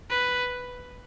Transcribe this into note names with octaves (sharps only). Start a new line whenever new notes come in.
B4